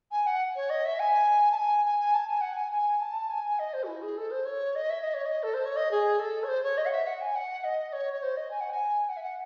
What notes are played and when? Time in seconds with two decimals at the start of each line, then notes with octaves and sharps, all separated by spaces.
0.12 G#5
0.26 F#5
0.56 C#5
0.70 D#5
0.85 E5
1.00 G#5
1.52 A5
1.57 G#5
1.85 G#5
2.00 G#5
2.14 A5
2.28 G#5
2.41 F#5
2.53 G#5
2.72 G#5
3.01 A5
3.30 G#5
3.59 D#5
3.73 C5
3.83 F#4
3.88 E4
4.02 G#4
4.17 A4
4.31 C5
4.45 C#5
4.75 D#5
4.90 E5
5.02 D#5
5.14 C#5
5.26 D#5
5.43 A4
5.54 C5
5.65 C#5
5.76 D#5
5.91 G#4
6.19 A4
6.44 C#5
6.48 C5
6.63 C#5
6.77 D#5
6.86 F#5
6.92 E5
7.07 F#5
7.21 G#5
7.35 F#5
7.64 D#5
7.93 C#5
8.13 C#5
8.23 C5
8.36 D#5
8.51 G#5
8.60 F#5
8.70 G#5
9.09 F#5
9.17 E5
9.23 F#5